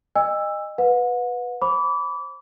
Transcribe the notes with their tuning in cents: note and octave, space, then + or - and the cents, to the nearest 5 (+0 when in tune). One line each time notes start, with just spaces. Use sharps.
D#5 -20 G#5 -45 E6 +5
B4 +0 F#5 -40
C5 +35 B5 +0 D6 -30